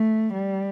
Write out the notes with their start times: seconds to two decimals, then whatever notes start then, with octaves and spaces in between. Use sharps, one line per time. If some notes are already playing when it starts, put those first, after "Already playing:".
Already playing: A3
0.33 G3